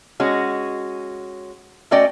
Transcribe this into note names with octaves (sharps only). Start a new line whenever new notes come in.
G#3 C#4 F#4
A3 C#4 F#4 D5 D#5 G5